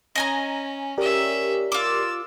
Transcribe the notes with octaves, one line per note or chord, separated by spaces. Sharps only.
C#4 D#5 G#5 A#5
C#4 G4 A#4 D5 E5
F4 D6 E6